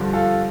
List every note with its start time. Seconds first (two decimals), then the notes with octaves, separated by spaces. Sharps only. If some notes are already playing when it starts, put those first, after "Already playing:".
Already playing: G2 D3 F3
0.13 F4 A4